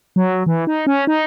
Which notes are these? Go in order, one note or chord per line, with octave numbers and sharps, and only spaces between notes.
F#3
E3
D#4
C#4
D#4